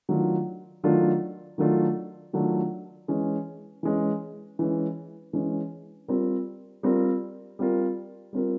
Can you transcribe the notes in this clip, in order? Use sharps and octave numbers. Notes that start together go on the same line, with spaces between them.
D#3 F#3 A3 D4 F4
D#3 F#3 A3 D4 F4
D#3 F#3 A3 D4 F4
D#3 F#3 A3 D4 F4
E3 G#3 C#4
E3 G#3 C#4
E3 G#3 C#4
E3 G#3 C#4
G3 C4 F4 A#4
G3 C4 F4 A#4
G3 C4 F4 A#4
G3 C4 F4 A#4